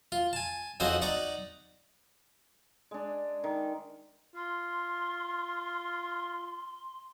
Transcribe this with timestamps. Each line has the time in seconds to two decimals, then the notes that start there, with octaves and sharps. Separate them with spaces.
0.12 F4
0.33 G#5 A5
0.80 F2 C#3 D#4 F#4 C5 F#5
1.02 D#4 D5 F#5 A#5 C#6 D6
2.91 G#3 D4
3.44 D#3
4.35 F4 C6